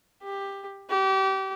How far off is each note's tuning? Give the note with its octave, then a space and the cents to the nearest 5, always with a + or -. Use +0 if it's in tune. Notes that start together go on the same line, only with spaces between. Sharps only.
G4 +10
G4 -30